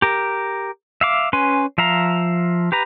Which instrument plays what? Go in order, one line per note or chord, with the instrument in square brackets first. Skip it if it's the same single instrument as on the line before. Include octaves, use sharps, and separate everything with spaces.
[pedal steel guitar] G4 A#4
E5 F5 D6
C#4 B4 G#5 C6
F3 E5 F5 A#5
G4 B4 A#5